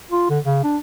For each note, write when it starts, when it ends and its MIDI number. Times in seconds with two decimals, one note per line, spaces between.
0.12 0.25 65
0.30 0.39 50
0.46 0.63 49
0.64 0.78 62